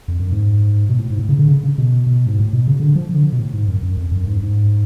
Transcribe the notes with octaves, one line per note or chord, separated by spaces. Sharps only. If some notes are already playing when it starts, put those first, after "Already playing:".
F2
F#2
G#2
B2
A2
G#2
A2
C#3
D3
C#3
C#3
B2
B2
G#2
A2
B2
C#3
D3
F3
D3
B2
A2
G#2
F#2
F#2
F2
F#2
G#2
F#2
G#2